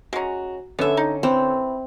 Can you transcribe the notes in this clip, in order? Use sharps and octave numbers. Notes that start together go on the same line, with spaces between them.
G#3 C#4 F#4 A#5
D3 B3 C#4 A4 E5
D#4
E3 C4